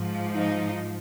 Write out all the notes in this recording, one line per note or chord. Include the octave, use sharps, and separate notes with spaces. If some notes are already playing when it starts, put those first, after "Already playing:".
Already playing: G#2 F3
D#4